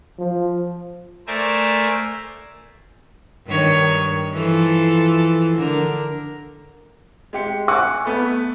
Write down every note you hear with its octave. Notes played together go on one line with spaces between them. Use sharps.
F3
A3 A#4 C5 D5 E5 G#5
G2 D#3 C#5
E3 F3 A4
D3 A#4
G#3 G4 C#7
F#5 G#5 C#6 D6 E6 F#6
A3 B3 B4